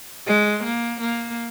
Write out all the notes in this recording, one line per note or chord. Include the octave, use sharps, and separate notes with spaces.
G#3
A#3
A#3